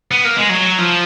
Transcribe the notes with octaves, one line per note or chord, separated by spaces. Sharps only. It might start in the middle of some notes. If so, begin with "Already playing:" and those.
B3
A#3
G#3
F#3
F3